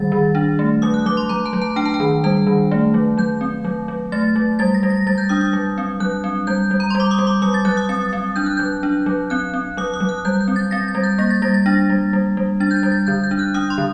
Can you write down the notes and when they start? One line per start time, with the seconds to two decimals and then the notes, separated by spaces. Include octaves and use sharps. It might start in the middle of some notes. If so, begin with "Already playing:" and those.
Already playing: D#3 G3 A6
0.12 D#3
0.35 D4
0.59 A3
0.82 F#3 D#6
0.94 F#6
1.06 F#3 D6
1.17 C6
1.29 F#3 A#5
1.46 A5
1.53 F#3
1.62 A5
1.76 D4 G5
1.85 A5
1.94 G5
2.00 D#3
2.24 G3 A5
2.47 D#3
2.71 A3
2.94 F#3
3.18 F#3 G6
3.41 C4
3.65 F#3
3.88 F#3
4.12 A3 A6
4.36 F#3
4.59 G3 A6
4.74 A#6
4.83 G3
4.90 A#6
5.07 G3 A6
5.18 G6
5.29 D4 D#6
5.41 D#6
5.53 F#3
5.78 C4
6.00 F#3 F#6
6.24 C4
6.47 G3 G6
6.71 G3
6.80 A#5
6.90 G3 C6
7.00 D6
7.11 D#6
7.19 G3
7.27 D6
7.42 F#3 D#6
7.54 A6
7.65 F#3 F#6
7.77 D#6
7.89 C4 A6
8.13 C4
8.36 D4 G6
8.46 F#6
8.57 F#3 G6
8.83 D4
9.06 F#3
9.30 C4 F#6
9.54 C4
9.77 F#3 D#6
9.94 D#6
10.00 F#3
10.09 F#6
10.25 G3 G6
10.41 G6
10.48 C4
10.56 A6
10.71 C4 A#6
10.88 A6
10.95 G3
11.04 G6
11.18 A#3 A#6
11.31 A6
11.42 G3 A#6
11.54 A6
11.66 D4 A#6
11.90 G3
12.13 G3
12.37 G3
12.60 D4 A6
12.71 G6
12.76 A6
12.83 G3
12.92 A6
13.07 D3 G6
13.24 G6
13.31 D4
13.39 F#6
13.54 D4 D#6
13.70 C6
13.78 D3